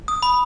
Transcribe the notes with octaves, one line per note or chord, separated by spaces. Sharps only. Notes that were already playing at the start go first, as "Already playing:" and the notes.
D#6
B5